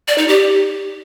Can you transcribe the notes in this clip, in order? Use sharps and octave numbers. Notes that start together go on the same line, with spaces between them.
D5
D#4
G4